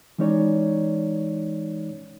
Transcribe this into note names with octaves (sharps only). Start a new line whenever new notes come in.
E3 G#3 C#4 D#4 C#5 D5